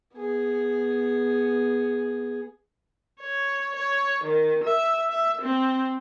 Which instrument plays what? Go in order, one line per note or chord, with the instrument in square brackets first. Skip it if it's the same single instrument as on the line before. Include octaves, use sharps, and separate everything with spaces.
[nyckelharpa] B3 G#4
[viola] C#5
C#5
D#3
E5
E5
C4